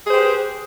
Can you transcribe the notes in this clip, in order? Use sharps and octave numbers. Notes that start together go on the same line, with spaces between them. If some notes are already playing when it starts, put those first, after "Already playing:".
G4 G#4 B4 C5